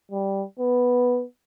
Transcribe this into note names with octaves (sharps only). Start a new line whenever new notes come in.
G3
B3